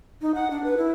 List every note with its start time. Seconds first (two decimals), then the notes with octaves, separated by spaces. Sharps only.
0.21 D#4
0.35 F#5
0.51 D4
0.64 B4
0.77 E4